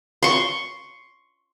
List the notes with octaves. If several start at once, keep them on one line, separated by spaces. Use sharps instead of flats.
C6 C#6